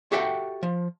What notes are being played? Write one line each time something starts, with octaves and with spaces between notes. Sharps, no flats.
F#4 G4 A4 E5 F#5 G5
F3